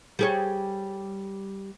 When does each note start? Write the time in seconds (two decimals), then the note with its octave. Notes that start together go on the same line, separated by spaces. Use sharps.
0.19 G3 G#4 C#5